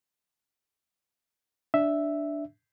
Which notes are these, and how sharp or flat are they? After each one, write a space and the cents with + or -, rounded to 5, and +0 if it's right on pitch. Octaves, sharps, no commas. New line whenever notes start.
D4 +0 E5 +0